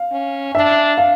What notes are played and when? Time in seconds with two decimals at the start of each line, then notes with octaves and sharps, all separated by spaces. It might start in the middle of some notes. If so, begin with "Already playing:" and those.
Already playing: F5
0.12 C#4
0.55 D4 E5
0.98 F5